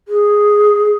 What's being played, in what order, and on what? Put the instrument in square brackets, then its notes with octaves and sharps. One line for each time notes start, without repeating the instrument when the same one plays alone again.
[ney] G#4